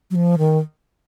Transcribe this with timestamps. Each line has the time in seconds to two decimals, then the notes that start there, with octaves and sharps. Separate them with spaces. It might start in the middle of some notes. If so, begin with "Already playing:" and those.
0.11 F#3
0.15 F3
0.38 D#3